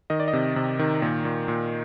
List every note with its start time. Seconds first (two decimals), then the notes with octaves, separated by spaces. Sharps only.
0.10 D#3 D#5
0.20 D5
0.28 D#5
0.33 C3
0.56 C3
0.79 D#3
1.02 A#2
1.25 A#2
1.48 A#2